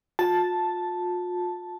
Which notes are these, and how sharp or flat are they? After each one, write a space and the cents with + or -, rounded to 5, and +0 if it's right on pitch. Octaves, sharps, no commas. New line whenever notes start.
F4 +40 A5 +0